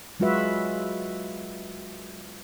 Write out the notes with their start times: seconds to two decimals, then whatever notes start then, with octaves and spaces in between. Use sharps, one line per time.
0.20 F#3 G#3 F4 F#4 B4 E5